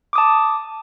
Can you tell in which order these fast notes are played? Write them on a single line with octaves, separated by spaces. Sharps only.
D6 D#6 A5